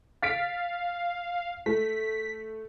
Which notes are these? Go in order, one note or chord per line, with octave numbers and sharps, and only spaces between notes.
F5 A6 B6 D7
A3 B6